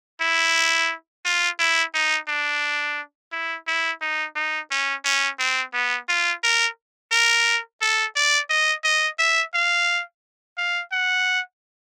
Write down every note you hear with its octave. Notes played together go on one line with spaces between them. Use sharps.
E4
F4
E4
D#4
D4
E4
E4
D#4
D#4
C#4
C#4
C4
B3
F4
A#4
A#4
A4
D5
D#5
D#5
E5
F5
F5
F#5